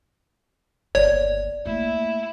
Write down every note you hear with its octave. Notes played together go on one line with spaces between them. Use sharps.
G1 D#2 C#5 D5
A3 A#3 E4